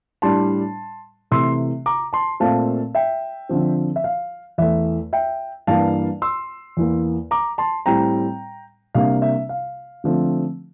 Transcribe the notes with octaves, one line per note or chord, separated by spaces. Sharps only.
A2 G3 D4 A5 C6
C3 E3 A3 C6 E6
A#5 D6
A5 C6
A#2 A3 C4 F5 A5
E5 G5
D3 F3 C4
E5
F5
E2 E3 A3 E5
E5 G5
G2 E3 A#3 D4 F5 A5
C6 E6
E2 E3 A#3
A#5 D6
A5 C6
A2 G3 C4 G5 A#5
C3 G3 A#3 D4 F5
E5
F5
D3 F3 A3 C4